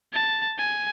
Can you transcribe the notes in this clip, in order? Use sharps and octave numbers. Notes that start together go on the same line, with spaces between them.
A5
G#5